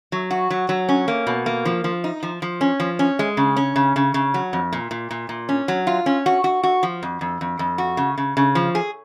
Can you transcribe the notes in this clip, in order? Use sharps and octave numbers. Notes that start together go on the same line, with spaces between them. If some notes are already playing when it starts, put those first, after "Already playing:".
F#3
F#4
F#3
F#3
C#4
A#3
B2
A#3
F3
F3
D#4
F3
F3
C#4
F3
C#4
G#3
C#3
C#4
C#3
C#3
C#3
F#3
F2
A#2
A#2
A#2
A#2
C#4
F#3
F4
C#4
F#4
F#4
F#4
F3
F2
F2
F2
F2
F#4
C#3
C#3
C#3
F3
G#4